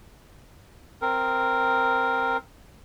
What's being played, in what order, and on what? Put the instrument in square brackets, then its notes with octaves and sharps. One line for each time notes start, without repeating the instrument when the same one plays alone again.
[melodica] C4 A#4